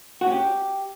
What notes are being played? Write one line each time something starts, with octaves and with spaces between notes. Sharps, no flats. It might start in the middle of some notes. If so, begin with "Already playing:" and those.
F#4
C#4
G4